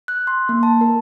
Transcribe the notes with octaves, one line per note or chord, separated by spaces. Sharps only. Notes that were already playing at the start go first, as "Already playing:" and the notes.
F#6
C6
A#3
A5
A#4